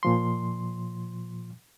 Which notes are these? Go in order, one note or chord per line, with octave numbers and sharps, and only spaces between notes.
A#2 F3 C6